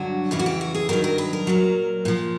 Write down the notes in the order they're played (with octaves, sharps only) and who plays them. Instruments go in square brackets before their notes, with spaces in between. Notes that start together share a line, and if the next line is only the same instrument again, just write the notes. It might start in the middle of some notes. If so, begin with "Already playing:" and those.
Already playing: [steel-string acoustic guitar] G2 D3 F#3 F#4
F2 C#3 E3 F4
F#4
G4
F#4
G#4
G2 D#3 F#3 A#4
A#4
B4
A#4
A#2 F#3
A#2 F3